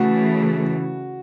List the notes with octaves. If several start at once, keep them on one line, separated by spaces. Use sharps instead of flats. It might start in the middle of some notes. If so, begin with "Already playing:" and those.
Already playing: C#3 E3 A3 F#4